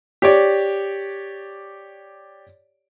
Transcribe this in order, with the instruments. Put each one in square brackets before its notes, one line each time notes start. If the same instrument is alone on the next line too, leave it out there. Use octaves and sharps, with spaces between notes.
[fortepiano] G4 C#5 D5